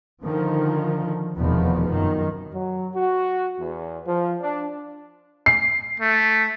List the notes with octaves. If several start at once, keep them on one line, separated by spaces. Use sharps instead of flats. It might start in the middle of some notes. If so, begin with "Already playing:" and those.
D3 D#3 F3
F1 E2 B2 D#3 F3 B3
F#2 D#3
F#3
F#4
E2
F3
D4
C7
A3